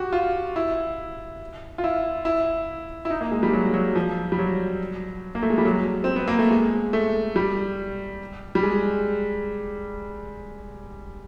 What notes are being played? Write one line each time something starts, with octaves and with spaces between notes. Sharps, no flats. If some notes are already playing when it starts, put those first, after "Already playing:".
Already playing: F#4 G4
F4
E4
F4
E4
E4
E4
D#4
A#3
G#3
G3
F#3
F#3
F3
G3
F#3
A#3
A3
G#3
G3
F#3
C4
B3
A#3
A3
G#3
A3
G3
G3
G#3